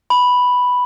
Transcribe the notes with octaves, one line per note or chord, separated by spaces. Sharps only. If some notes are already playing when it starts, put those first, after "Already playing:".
B5